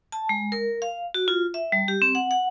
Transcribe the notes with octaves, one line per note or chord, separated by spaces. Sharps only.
A5
G#3
A#4
F5
F#4
F4
E5
G3
G4
C4
F#5
F#5